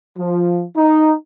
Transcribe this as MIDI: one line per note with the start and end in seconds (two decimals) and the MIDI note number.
0.17 0.65 53
0.76 1.13 63